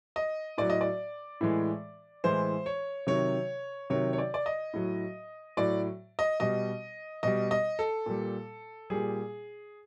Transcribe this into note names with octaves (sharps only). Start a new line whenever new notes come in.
D#5
A2 F#3 D5
D#5
D5
A2 E3 G#3
A2 E3 G#3 C5
C#5
C3 D#3 F#3 C#5
C3 D#3 F#3 C#5
C#5
D5
D5
D#5
A2 F#3
A2 F#3 D5
D#5
B2 G3 D#5
B2 G3 D#5
D#5
A4
A#2 G3
A#2 G3 G#4